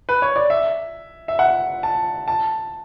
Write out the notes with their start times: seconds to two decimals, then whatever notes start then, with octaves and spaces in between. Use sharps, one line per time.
0.09 B4
0.22 C#5
0.36 D5
0.50 E5
1.28 E5
1.39 F#5
1.83 A5
2.28 A5